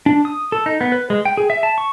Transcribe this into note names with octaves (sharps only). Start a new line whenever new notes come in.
D4
D#6
A4
D#4
B3
B4
G#3
G5
G#4
E5
A5
C#6